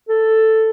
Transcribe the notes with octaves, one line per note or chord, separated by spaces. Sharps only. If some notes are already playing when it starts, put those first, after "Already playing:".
A4